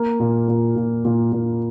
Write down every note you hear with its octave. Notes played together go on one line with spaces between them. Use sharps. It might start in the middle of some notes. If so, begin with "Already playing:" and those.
Already playing: A#3
A#2
A#2
A#2
A#2
A#2